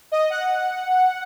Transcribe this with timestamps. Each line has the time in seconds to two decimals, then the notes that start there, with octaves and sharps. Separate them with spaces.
0.12 D#5
0.30 F#5